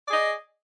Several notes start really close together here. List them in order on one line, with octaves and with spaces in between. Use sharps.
D5 G#4 D#5